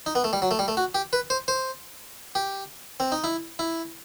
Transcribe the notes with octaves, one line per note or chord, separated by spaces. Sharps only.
D#4
B3
A3
G3
F#3
A3
G3
A3
F#4
G4
B4
C5
C5
G4
C4
D#4
E4
E4